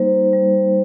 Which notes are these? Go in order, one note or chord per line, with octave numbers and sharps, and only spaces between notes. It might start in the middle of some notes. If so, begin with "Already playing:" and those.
Already playing: G3 A#3 D#4 C5
G3